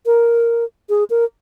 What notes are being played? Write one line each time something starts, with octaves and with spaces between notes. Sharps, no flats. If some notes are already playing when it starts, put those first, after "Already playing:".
A#4
G#4
A#4